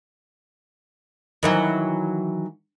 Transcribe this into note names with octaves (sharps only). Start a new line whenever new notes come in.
D#3 E3 F#3